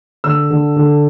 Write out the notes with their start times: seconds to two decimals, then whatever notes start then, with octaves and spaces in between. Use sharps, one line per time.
0.24 D3 E6
0.50 D3
0.76 D3